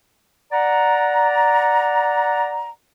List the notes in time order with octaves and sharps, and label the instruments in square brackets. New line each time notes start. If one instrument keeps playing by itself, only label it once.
[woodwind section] D5 F#5 A#5